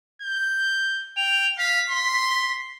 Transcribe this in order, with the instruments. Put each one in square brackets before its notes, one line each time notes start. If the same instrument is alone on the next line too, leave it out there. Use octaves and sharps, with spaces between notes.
[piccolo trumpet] G6
[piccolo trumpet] G5 [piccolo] F7
[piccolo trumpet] F5 [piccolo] B6
[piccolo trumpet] C6